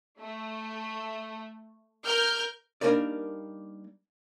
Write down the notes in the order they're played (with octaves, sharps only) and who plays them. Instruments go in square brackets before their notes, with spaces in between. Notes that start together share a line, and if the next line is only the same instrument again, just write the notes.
[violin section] A3
A#4 F6 G6
[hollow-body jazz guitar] G3 A#3 D4 D#4 A#4 D5